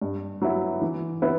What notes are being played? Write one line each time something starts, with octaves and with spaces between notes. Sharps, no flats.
G2
F#3 B3 E4
E3
B3 E4 B4